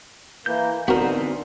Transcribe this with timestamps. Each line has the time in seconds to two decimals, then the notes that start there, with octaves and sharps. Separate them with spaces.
0.46 E3 A#3 G6
0.88 D3 E3 B3 C4 D#4 F#4 A#4